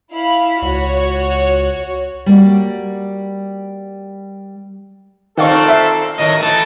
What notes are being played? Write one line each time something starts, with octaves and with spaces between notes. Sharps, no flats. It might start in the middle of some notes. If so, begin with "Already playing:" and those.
E4 F5 B5
C#2 F#4 C#5
G3 A#3 F#4
A#2 D#3 C4 A4 F5 C#6
E5 C7
A2 D#3 F#3 D#5
E3 A3 A5